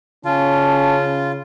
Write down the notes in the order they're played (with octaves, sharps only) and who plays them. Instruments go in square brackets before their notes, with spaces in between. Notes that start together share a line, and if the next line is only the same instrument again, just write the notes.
[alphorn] C#3 [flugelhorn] C#4 [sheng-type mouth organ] F4 [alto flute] A5